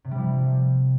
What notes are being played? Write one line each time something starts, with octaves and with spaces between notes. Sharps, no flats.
C3
G3
F3